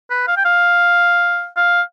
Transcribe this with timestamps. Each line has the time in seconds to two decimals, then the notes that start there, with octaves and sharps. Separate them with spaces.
0.10 B4
0.28 F5
0.37 G5
0.45 F5
1.57 F5